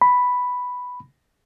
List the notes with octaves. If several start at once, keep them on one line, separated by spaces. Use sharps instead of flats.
B5